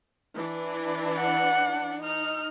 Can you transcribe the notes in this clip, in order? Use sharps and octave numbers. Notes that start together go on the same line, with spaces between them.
E3 D4
F#5
D#4 F6